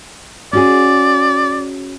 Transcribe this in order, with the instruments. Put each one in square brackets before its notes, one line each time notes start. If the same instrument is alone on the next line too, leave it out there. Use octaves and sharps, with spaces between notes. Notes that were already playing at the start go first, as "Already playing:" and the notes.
[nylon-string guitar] C#4 F#4 G#4 [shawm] D5